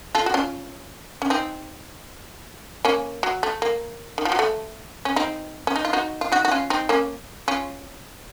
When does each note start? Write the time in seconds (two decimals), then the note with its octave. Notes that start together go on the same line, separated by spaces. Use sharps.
0.15 F4 A4
0.26 F#4
0.34 C#4 F4
1.22 C#4
1.30 C4 D#4
2.85 A#3 C#4
3.23 F#3
3.43 A3
3.62 A#3
4.18 D#3
4.25 F3
4.32 F#3
4.39 A3
5.05 C#4
5.16 C4 D#4
5.67 C#4
5.76 D#4
5.85 F4
5.93 D#4 F#4
6.21 F4
6.32 D#4 F#4
6.45 F#4
6.51 C#4 F4
6.70 C4 D#4
6.89 A#3 C#4
7.48 C#4 F4